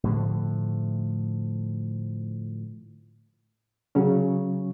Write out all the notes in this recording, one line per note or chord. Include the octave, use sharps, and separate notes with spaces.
A2 D3 F3
C#3 F#3 C#4